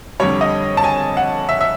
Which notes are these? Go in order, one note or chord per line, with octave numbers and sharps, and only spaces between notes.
F2 D3 G3 C#5
D#5
A5
G#5
F#5
E5
E5